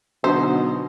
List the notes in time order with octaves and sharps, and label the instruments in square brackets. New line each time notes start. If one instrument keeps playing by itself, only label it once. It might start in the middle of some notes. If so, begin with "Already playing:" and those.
[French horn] B2 [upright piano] D3 F#3 D#4 [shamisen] C5